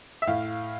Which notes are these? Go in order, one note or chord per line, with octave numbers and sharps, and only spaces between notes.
E5
A2 F5